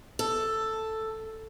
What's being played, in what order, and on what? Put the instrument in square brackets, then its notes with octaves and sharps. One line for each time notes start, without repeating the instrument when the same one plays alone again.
[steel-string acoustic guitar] A4